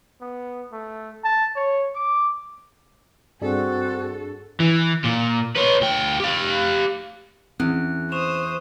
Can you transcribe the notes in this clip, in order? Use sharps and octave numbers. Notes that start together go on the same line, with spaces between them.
B3
A3
A5
C#5
D6
G2 C4 D4 F#4 G#4 A4
E3
A#2
B4 C#5
D2 G5
G4 F5
E2 C4 C#4 F#6
C5 C#6 D#6 E7 F7